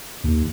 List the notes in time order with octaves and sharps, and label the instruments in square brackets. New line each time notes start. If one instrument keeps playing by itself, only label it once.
[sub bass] D#2